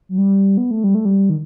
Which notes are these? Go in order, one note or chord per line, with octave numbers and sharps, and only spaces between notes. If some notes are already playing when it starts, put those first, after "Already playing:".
F#3
G3
B3
A3
G3
A3
G3
D#3